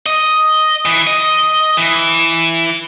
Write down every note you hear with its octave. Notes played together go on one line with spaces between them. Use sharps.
D#5
E3
D#5
E3